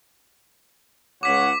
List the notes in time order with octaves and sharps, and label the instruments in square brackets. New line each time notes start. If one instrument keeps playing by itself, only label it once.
[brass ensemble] C#2 C#5 F#5 [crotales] D6 B6